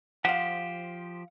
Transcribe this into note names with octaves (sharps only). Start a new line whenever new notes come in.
F3 G4 C5 F5 F#5